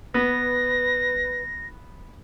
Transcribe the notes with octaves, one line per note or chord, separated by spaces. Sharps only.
B3 B4 A#6